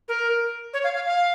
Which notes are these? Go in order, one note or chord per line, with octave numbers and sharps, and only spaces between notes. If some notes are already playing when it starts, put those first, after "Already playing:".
A#4
C#5
F5
F5
F5